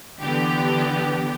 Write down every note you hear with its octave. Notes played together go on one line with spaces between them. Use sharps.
D3 E3 B3 G4